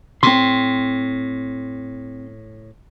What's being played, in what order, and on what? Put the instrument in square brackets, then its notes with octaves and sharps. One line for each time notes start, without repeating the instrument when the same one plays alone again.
[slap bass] A2 [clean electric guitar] C4 C6